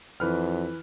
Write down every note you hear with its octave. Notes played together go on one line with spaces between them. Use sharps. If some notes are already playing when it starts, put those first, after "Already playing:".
F2 E3 B4 F6